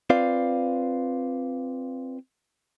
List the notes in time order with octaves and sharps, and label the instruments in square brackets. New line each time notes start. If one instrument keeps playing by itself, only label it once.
[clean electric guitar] C4 F4 B4 D5 F5